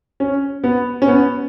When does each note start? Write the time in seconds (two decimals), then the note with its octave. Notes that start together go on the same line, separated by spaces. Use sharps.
0.20 C#4
0.64 B3
1.02 C#4
1.08 B3